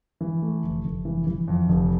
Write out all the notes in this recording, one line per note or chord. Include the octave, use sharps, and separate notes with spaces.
E3
A3
F1
F1
E3
E3
F2
F1